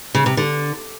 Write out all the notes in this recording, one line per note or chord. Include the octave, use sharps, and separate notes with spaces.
C#3
C3
D3